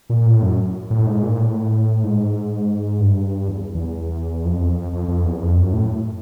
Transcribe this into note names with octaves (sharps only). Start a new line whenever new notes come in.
A#2
A2
F#2
A2
G#2
A#2
A2
G#2
G2
E2
E2
F2
F2
F2
E2
F2
F#2
A2